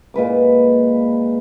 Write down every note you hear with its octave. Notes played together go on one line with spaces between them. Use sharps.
A#2 G#3 B4 D6